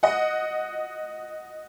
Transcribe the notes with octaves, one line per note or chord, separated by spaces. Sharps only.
D#5 F#5